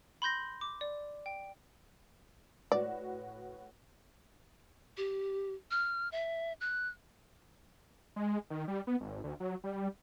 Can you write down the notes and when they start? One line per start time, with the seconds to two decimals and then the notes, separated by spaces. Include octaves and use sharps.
0.22 B5 C6 G6 A#6
0.61 D6
0.81 D5
1.26 G5
2.72 A2 F#4 B4 D5
4.97 G4
5.71 F6
6.12 E5
6.61 F#6
8.16 G#3
8.50 D#3
8.68 G3
8.87 B3
9.01 G#1
9.24 D2
9.40 F#3
9.64 G3